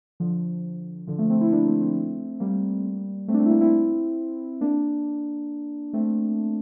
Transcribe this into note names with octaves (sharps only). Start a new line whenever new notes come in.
D3 F3
D3 F3
F3 A3
A3 C4
C4 E4
A#3 D4
A3 C4
A3 C4
G3 A#3
A3 C4
D4
A3 C4
E4
A#3 D4
C4 E4
A#3 D4
A3 C4